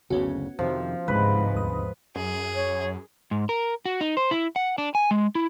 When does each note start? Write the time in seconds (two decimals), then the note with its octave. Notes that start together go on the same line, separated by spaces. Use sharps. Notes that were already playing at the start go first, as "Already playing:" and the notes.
0.10 F#1 D2 C#3 B3 C#4 F#4
0.59 F2 C3 D#3 F3
1.08 G1 C#2 G#2 C3 B4
1.54 D#2 D#6
2.16 F#2 G#4
2.55 C#5
3.31 G#2
3.49 A#4
3.85 F#4
4.01 D#4
4.17 C5
4.31 E4
4.56 F#5
4.78 D4
4.95 G#5
5.11 G#3
5.35 E4